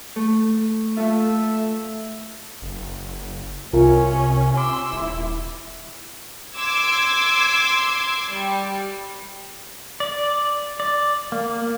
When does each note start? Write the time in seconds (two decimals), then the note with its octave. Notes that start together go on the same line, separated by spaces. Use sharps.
0.16 A3
0.97 A3 F4 A4 E5
2.62 F#1
3.73 C2 C3 C#4 F4 A#4
4.57 C6 D6 E6
4.93 D#1 E4
6.56 C6 D6 E6 G#6
8.30 G3
10.00 D5
10.80 D5
11.32 A#3